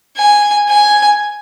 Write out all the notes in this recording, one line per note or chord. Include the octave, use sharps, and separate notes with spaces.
G#5
G#5